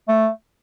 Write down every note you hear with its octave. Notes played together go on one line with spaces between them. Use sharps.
A3